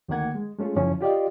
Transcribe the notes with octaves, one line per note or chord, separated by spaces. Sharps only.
D2 D#3 A3 A#3 F#5 G#6
G#3
G#3 A3 C#4 F4 G#4
F#2 C#3 F3 C#4 E4
F4 G4 D5 D#5 F5